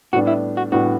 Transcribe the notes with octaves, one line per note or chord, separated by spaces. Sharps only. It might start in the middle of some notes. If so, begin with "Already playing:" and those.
A2 G3 B3 D4 F#4
E4
F#4
A2 G3 B3 D4 F#4